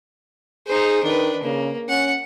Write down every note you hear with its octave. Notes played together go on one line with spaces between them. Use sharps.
D#4 G#4 C5
D#3 D4 B4
C#3 A#3
C#4 F#5